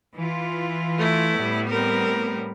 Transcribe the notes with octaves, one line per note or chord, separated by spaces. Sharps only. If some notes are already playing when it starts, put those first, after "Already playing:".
E3 F4
A3 E4
A2 G3 B3
C4 A#4